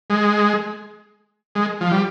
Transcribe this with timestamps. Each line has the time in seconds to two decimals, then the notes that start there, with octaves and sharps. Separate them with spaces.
0.10 G#3
1.55 G#3
1.81 F3
1.91 G3